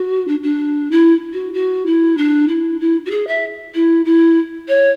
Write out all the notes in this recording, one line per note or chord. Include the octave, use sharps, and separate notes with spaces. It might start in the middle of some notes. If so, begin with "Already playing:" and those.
Already playing: F#4
D4
D4
E4
F#4
F#4
E4
D4
E4
E4
F#4
G#4
E5
E4
E4
C#5